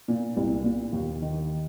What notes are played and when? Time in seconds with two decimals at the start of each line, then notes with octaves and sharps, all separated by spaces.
0.08 A#2
0.37 C2
0.64 A#2
0.93 D#2
1.22 D#3